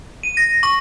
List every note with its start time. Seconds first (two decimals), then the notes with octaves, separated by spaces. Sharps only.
0.23 D#7
0.37 A#6
0.63 C#6